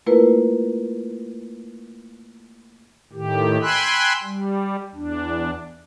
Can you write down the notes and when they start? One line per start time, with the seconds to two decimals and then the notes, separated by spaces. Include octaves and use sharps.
0.06 A3 A#3 E4 F4 A#4 B4
3.13 A2 D#3 G4
3.62 G5 G#5 B5 C6 E6 F#6
4.23 G3
4.95 E2 D4